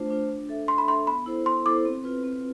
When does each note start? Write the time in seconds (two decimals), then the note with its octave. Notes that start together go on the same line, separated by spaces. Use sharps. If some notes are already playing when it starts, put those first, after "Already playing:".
Already playing: A3 D4 F4 C5
0.10 D4 F4 C5
0.29 D4
0.49 A4 E5
0.68 D4 C6
0.78 B5
0.88 A4 E5 C6
1.07 B3 B5
1.26 E4 A4 C5
1.46 B3 C6
1.66 E4 A4 C5 D6
1.85 C4
2.04 F4 B4
2.24 C4